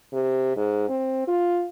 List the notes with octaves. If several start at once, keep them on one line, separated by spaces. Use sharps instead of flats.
C3
G#2
C4
F4